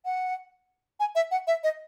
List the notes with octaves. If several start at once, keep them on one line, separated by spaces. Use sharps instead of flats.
F#5
G#5
E5
F#5
E5
D#5